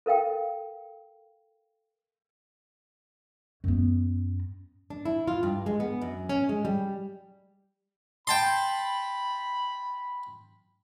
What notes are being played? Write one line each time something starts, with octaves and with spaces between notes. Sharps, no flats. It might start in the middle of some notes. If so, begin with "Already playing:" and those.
A4 A#4 F5 G5
F#2 B3
D4
E4
F4
G2
G#3
B3
F#2
C#4
G#3
G3
G5 A5 B5 C6